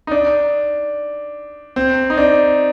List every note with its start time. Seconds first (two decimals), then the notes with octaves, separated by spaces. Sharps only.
0.07 D#4
0.11 D4
1.76 C4
2.10 D#4
2.17 D4